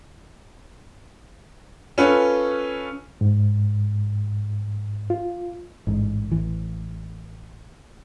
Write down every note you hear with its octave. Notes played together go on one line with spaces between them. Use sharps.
C#4 F4 A4 B4 C#5
G#2
F4
A1 G#2
A1 E3